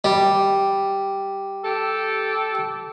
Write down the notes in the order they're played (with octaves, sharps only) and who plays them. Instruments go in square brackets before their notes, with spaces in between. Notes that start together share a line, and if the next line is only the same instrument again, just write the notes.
[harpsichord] G3
[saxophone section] G4 A4